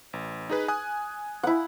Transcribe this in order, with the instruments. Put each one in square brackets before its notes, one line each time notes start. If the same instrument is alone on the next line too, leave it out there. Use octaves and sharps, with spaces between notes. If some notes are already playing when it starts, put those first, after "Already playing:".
[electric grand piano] A1
D#4 G#4 B4
G#5 D#6 F#6
[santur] E4 F#5